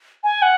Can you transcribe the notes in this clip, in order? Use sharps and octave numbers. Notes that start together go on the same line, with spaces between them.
G#5
F#5